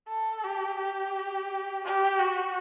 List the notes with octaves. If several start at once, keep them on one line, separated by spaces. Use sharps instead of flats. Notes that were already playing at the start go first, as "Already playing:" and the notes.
A4
G4
G4
G4
F#4